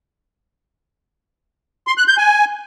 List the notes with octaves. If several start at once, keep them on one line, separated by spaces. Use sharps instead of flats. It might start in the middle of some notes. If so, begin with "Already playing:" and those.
C6
F#6
G6
G#5